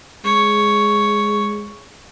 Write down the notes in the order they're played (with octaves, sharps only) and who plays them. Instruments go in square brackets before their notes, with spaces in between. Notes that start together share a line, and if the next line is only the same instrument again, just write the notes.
[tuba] G#3 [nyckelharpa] C#5